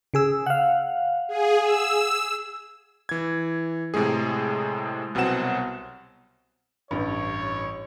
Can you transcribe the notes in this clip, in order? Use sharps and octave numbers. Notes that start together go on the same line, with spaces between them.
C#3 G#4 E6
F5 F#5
G#4
E6
E3 G#6
A2 C3 G#3 G#4
C2 B2 F#3 C4 F#5 E7
A1 G2 C#5